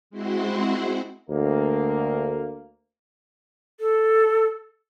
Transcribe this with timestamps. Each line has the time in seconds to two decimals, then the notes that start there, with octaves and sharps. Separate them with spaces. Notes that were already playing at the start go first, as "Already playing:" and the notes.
0.10 G#3 C4 E4 F#4 C5 F#5
1.30 D2 A#3
3.80 A4